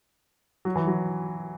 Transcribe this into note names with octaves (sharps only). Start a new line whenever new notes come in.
F#3
E3
F#3